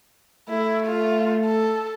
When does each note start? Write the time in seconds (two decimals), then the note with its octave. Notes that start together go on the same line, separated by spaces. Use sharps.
0.49 A3 E4
0.86 F4
1.46 A4